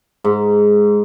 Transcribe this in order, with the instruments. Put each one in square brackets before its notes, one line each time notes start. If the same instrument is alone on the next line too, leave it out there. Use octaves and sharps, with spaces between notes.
[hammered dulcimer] G#2